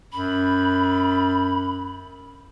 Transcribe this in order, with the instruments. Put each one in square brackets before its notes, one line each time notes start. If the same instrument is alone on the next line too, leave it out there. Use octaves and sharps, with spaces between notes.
[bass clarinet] F#2 [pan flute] B5